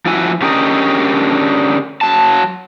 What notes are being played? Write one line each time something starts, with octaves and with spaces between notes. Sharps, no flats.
F3 E4 F#4 G#5
D3 C#4 G4 G#4 A#4 D#5
F#3 A5